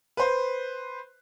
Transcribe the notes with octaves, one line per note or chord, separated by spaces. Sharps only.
B4 C5